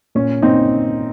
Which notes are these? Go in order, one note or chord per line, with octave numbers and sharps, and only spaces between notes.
A#2 C#4
A#2 C4 D#4